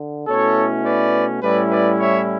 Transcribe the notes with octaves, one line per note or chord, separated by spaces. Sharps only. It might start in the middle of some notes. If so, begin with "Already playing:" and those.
Already playing: D3
B2 A3 C#4 E4 A4 C#5
B4 D5
A2 G3 C#4 E4 B4 D5
B4 D5
C#5 E5